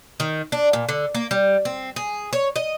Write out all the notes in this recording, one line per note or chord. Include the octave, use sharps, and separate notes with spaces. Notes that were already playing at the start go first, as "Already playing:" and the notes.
D#3
D4
A#2
D3
A#3
G3
C4
G#4
C#5
D#5